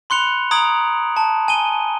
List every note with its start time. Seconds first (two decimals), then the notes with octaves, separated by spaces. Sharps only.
0.10 B5 C6 F#6 C#7 F7
0.51 A#5 D#6 G#6 D7 F#7
1.17 A5
1.48 G#5 D#7 G7